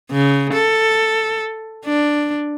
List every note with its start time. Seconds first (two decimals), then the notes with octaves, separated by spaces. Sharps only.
0.12 C#3
0.53 A4
1.86 D4